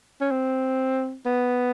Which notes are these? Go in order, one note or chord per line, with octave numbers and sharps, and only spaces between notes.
C#4
C4
B3